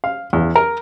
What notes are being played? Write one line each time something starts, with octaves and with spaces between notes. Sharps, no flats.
F5
E2
A#4